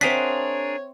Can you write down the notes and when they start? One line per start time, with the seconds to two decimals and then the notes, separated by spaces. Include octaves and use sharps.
0.01 C4 D4 G#4 A#4 C#5 E5 F#5 B6